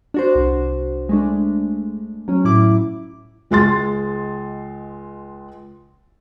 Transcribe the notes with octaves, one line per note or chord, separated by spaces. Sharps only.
D4 F#4 C5
C2
G#3 A3 D4
F#3 C#4
A2 E4 D6
C#2 G#3 C6 A6